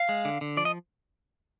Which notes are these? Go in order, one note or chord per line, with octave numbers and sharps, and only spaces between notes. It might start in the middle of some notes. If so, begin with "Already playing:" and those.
Already playing: F5
G#3
D3
D3
F3 D5
D#5